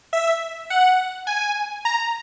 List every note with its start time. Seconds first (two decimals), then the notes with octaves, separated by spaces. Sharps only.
0.13 E5
0.70 F#5
1.27 G#5
1.85 A#5